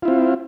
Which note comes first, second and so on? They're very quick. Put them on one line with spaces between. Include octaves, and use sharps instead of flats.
F4 E4 C4